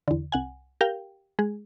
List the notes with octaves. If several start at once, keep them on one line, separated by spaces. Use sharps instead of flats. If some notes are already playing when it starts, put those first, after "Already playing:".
E2 D3
C2 F#5 G#5
G4 A#4 F5 G5
G#3 G#4